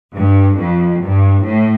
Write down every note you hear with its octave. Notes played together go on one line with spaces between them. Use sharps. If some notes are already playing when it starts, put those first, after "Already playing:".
G2
F2
G2
A2